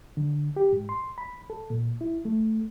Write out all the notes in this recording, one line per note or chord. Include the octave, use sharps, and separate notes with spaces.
D3
G4
G#2
C6
B5
A4
A#2
E4
A3